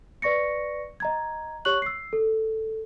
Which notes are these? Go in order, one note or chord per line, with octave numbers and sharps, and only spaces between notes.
B4 D5 C#6 A#6 C#7
D#5 A#5 G#6
G4 C#5 C#6 F#6 F#7
E6 C7
A4